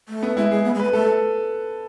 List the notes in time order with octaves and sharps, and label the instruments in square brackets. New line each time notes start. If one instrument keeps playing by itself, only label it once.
[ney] A3
[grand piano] B3
[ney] G#3 [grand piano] E4
[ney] G#3 [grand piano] G#4
[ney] B3
G#3
[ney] A3 [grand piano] B4
[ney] A3 [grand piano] A4